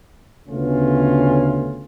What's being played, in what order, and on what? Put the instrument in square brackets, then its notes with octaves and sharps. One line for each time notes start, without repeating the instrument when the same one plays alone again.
[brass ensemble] D2 C#3 A3 B3 C#4 F4